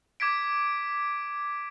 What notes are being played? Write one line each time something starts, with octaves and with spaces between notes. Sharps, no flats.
D6 G#6 B6 D7